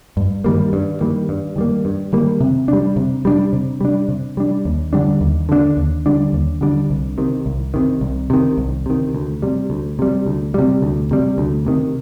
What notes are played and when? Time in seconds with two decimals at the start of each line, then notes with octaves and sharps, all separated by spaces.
0.17 G2
0.44 D#3 G3 A#3
0.73 G2
1.01 D#3 G3 A#3
1.29 G2
1.56 D#3 G3 A#3
1.85 G2
2.13 D#3 G3 A#3
2.40 C3
2.68 G3 D4
2.96 C3
3.25 G3 D4
3.53 C3
3.81 G3 D4
4.08 C3
4.37 G3 D4
4.65 D#2
4.93 D3 G3 D4
5.21 D#2
5.49 D3 G3 D4
5.77 D#2
6.06 D3 G3 D4
6.33 D#2
6.61 D3 G3 D4
6.90 C2
7.18 C3 D#3
7.46 C2
7.74 C3 D#3
8.01 C2
8.30 C3 D#3
8.58 C2
8.86 C3 D#3
9.15 D2
9.42 C3 G3
9.70 D2
9.99 C3 G3
10.26 D2
10.54 C3 G3
10.82 D2
11.11 C3 G3
11.38 D2
11.66 C3 D#3